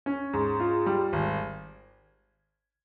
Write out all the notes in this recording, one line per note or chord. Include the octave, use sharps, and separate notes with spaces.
C#4
G#2
F4
G3
G#1